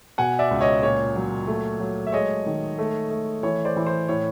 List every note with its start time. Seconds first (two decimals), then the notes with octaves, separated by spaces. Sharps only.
0.18 B2 F#5 G#5
0.39 D5 E5
0.51 C#2
0.61 C#5 D#5
0.83 A#2 C#5
1.16 F#3
1.47 A3
1.80 F#3
2.07 E5
2.13 G#3 C#5 D#5
2.46 D#3
2.78 A3
3.11 A3
3.43 E3 C#5
3.65 C5 D5
3.76 E3
3.86 C5
4.08 A2 C#5